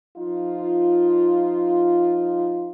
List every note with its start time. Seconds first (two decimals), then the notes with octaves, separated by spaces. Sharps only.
0.16 F3 D#4 F4